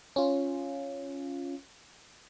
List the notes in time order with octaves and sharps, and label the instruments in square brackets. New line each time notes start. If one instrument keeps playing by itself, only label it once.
[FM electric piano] C#4 F4